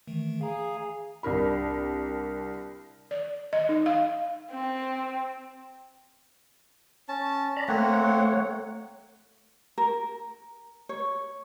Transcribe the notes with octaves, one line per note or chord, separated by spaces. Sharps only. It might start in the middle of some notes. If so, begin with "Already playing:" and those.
D#3 E3 A3
G#4 F5 A#5
C2 D4 A#4 B5
D5
D#5
D#4
F5
C4
C#4 A5
D5 A#5 B5
A3 A#3 C4 C#5 F#5
A#4
C#5